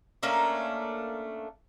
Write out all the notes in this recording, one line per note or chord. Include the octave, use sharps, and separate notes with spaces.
A3 A#3 C#4 D4